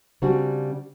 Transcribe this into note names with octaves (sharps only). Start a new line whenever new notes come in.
C#3 G3 C4 D4 F#4